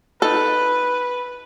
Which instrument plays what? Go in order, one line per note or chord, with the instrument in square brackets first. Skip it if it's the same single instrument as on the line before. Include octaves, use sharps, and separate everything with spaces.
[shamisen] D#4 A4 [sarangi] B4